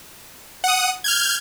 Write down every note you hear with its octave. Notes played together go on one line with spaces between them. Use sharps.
F#5 D#6
F6 G6 G#6